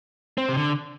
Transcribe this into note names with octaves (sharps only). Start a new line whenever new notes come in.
C4
C3
D3